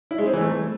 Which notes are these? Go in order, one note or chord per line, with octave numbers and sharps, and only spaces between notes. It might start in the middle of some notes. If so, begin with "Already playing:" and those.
E4
G#3
C4
E3
A3